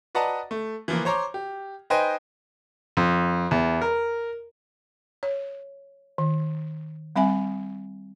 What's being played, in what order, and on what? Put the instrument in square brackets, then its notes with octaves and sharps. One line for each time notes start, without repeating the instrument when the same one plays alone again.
[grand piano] B4 D5 D#5 F#5 A5 A#5
A3
E3 F3 A#3
C5 C#5 A#5 C6 D6
G4
D#4 B4 C5 D#5 G5 G#5
[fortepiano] F2
E2
A#4
[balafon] C#5
D#3
G3 C4 E5 G#5